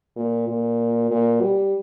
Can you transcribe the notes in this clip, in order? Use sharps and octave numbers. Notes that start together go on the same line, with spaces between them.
A#2
A#2
A#2
G3